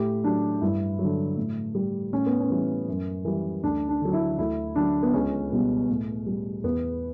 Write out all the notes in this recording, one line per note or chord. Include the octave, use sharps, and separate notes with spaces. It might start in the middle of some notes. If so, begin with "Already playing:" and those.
Already playing: A2 G4
F#3 D4
G2 E4
F#3
D3
A2
G3
A2 C#4
B3
C#4
E3 G3
F#2
E3 G3
D2 D4
D4
D3 F#3
E4
D2 E4
D3 F#3 D4
B3
C#2 C#4
B2 G3
A2
G3
E2 B3